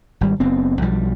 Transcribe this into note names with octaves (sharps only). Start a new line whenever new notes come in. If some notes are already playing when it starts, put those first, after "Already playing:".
G#1 G3
F#1 B3 C4
B1 F3 G3